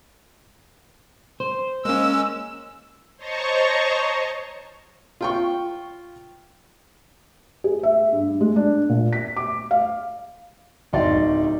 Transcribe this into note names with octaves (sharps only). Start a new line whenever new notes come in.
C5
G#3 A#3 C#4 E6
C5 C#5 D#5 A5 A#5 C#6
F4 G5 C#6
G#4
E5
G2
G#3
D4
A#2
B6
D6
F5
D1 D#4 D5 C6